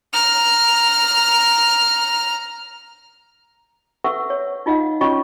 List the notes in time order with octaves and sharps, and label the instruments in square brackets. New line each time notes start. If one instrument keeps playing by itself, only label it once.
[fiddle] A#5 F6
[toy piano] A4 B4 E5 F#5 C#6 E6
C#5
D#4 F4 D#5 F5 F#5
C#4 F4 C#5 D#5 C#6